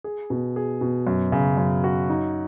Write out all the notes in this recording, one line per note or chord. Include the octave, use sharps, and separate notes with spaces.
G#4
B2
G#4
B2
F#2
C#3
F#2
F#4
D#4